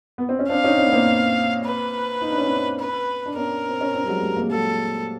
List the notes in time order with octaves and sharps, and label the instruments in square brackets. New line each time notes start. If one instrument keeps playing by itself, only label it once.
[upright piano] B3
C4
C#4
[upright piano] C4 D4 [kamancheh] F5
[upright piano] C#4 D#4
C4 D4
B3
A#3 C4
[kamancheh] B4
[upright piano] D#4
D4
C#4
C4 D4
[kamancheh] B4
[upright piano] D4
[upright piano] B3 C#4 [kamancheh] A#4
[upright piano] C4
C#4
C4 D4
G3
F#3 G#3
G3 A3
G#3 A#3
[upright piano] F#3 G#3 [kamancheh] A4